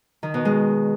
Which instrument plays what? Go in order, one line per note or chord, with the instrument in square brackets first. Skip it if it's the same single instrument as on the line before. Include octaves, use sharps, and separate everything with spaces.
[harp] D#3
B2
G#3